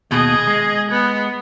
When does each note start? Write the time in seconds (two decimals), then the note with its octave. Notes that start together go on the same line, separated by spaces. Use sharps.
0.11 D#2 B2 G#4 D#5
0.47 G#3
0.91 B3